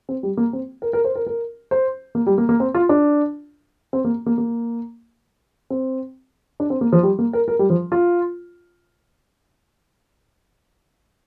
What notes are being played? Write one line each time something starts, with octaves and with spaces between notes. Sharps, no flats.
C4
G3
A#3
C4
A#4
A#4
C5
A#4
A#4
C5
A#3
G3
A#3
A#3
C4
F4
D4
C4
A#3
A#3
A#3
C4
D4
C4
A#3
F3
G3
A#3
A#4
A#4
G3
F3
F4